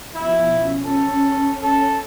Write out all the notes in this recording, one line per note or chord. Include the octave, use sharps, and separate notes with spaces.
B2 F3 E4
C#4
A4
A4